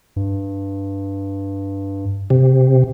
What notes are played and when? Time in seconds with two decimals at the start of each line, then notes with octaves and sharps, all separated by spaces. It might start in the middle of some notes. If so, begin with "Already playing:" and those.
0.16 G2
2.30 C3